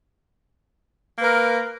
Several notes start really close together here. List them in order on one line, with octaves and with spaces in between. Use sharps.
A#3 B4 A#4